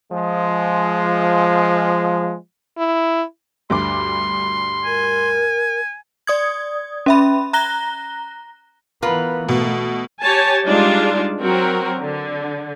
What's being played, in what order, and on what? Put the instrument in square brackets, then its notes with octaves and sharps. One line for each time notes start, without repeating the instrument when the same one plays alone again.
[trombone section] F3 G#3
[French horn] E4
[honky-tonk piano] D2 G2 D6 [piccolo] C6
[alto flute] A#4 [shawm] G#5
[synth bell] D5 D#6 G#6
C#4 E5 B5
A#5 F#6 A#6 G7
[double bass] E3 B3 [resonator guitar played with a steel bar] F4 A#4 B4
[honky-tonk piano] B2 [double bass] A3
[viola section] G4 C#5 G#5 A5
G3 G#3 D4 D#4 F4
F#3 C4 F#4 A#4
D3